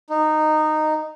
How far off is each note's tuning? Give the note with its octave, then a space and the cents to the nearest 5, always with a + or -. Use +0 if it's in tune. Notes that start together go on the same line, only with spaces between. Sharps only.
D#4 -15